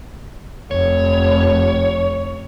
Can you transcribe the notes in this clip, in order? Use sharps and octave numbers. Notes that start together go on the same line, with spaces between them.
F1 C#5